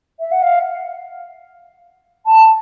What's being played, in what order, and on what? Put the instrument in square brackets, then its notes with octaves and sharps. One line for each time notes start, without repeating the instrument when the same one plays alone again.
[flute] E5
F#5
F5
A5